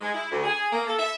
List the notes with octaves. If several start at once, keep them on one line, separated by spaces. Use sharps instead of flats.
G#3
E4
D2
G#4
A#3
A4
E5